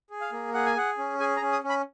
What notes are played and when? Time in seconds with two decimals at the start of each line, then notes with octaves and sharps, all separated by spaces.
0.10 G#4
0.21 F5
0.32 A#3
0.54 G#4 F#5
0.66 G#5
0.76 G#4 F#5
0.98 C#4
1.20 G#4 G#5
1.36 A#5
1.42 C#4
1.53 D#6
1.64 C#4
1.70 B5